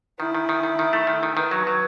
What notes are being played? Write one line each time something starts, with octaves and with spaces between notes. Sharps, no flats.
D#3 E4
D#3
D#3
D#3
D#3
A3
D#3
D#3
D#3 B4
F#3
F#3